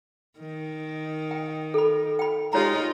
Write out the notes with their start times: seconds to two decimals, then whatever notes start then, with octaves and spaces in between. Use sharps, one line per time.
0.39 D#3
1.31 G5
1.74 A4 B5
2.19 G5 B5
2.53 G#3 D#4 F4 G4 C#5 A#5